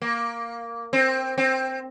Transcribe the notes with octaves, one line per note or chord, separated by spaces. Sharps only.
A#3
C4
C4